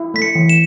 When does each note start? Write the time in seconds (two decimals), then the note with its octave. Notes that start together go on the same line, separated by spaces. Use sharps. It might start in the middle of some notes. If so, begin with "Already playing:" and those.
Already playing: E4
0.14 A3 B6
0.22 C#7
0.35 E3
0.49 E7